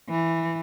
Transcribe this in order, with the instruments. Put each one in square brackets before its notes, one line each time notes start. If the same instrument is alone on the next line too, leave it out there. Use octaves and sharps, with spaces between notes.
[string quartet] E3